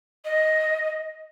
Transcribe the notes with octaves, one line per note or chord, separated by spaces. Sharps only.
D#5